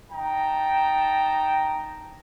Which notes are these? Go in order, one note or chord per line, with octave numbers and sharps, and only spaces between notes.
D#4 G5 A5 A#5